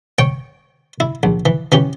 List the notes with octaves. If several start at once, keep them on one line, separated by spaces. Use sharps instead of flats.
C#5 G5
E4
A#1
E3
E3 C#4 G4